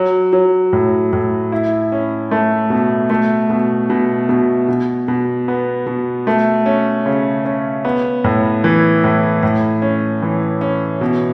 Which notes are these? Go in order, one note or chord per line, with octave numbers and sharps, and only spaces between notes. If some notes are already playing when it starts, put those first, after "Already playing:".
Already playing: F#3
F#3
A2
A2
E4
C#4
A3
B2
A3
B2
B2
B2
B2
B2
B3
B2
A3
C#4
C#3
C#4
B3
A2
E3
A2
A2
C#4
E3
C#4
B2